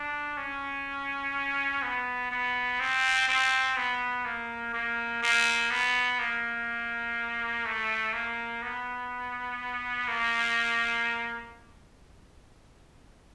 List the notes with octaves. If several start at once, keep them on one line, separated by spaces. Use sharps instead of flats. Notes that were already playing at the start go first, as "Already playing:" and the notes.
Already playing: D4
C#4
B3
B3
C4
C4
B3
A#3
A#3
A#3
B3
A#3
A3
A#3
B3
A#3